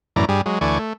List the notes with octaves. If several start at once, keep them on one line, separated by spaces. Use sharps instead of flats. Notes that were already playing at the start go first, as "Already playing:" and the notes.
F#2 A2 E3 D5 A#5
G2 G3 G#4
F#3 G#3
D2 E3 A3 D5 G#5 C#6
A3